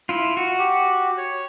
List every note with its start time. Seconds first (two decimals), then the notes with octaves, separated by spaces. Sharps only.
0.09 E4 F4
0.37 F#4
0.59 G4
1.18 C#5